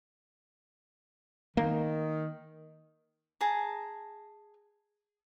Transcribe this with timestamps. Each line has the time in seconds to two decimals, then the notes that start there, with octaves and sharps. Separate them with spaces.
1.57 D#3 A#3
3.41 G#4 A5 A#5